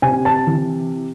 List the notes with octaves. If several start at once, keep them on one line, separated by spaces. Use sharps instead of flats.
C3 G#5
A5
E3